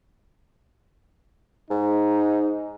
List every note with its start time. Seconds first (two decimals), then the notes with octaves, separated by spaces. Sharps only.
1.70 G#2 D#4